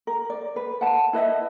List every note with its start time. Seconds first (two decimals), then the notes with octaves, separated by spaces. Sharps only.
0.07 A#4
0.30 D5
0.56 B4
0.81 F#5 A5
1.13 E4 B4 D#5 E5